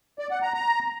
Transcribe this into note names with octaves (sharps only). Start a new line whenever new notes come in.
D5
F#5
A#5
A#5